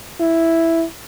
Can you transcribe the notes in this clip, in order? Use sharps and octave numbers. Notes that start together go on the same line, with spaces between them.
E4